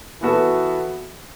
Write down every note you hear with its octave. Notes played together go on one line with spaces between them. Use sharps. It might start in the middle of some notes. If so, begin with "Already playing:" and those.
E3 B3 F#4 A4